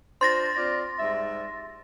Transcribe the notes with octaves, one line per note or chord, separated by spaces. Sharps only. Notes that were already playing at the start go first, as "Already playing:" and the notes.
D4 F4 C5 C6 A6 A#6
C4 F4 D5
G#2 G3 E5